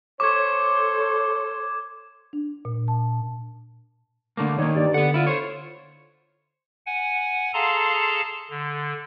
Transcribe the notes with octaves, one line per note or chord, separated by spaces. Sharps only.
A4 C5 C#5 C#6 D6 G#6
D4
A#2
A5
D3 A3 A#3
D#3 A#3 D4 C#5
G2 D5
D3 B3 F#5
E4 F4
C5 C#5
F#5 G#5
G#4 A4 F5 A5 A#5 C6
D3